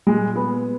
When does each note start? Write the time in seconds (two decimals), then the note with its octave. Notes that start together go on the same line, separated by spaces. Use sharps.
0.07 A#2 G#3
0.36 B3